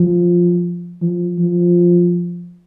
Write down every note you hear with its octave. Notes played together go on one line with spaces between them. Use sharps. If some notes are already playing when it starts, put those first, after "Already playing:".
Already playing: F3
F3
F3